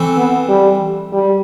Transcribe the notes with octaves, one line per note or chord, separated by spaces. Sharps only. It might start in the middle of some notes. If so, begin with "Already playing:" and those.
Already playing: E3 A3 C4
B3
G3
G3